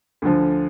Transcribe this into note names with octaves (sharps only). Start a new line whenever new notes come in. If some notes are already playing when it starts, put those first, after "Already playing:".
D2 D3 F3